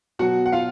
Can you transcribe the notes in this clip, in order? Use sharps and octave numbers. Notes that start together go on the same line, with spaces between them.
B2 F#3 F#4 F#5
F#5
F4 F5